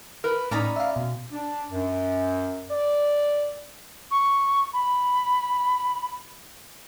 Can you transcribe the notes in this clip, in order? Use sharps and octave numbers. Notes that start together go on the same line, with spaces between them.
A#4 B4
A2 C#4 D#4 D5 A#5 B5
E5 F5
B2
D4
F#2
D5
C#6
B5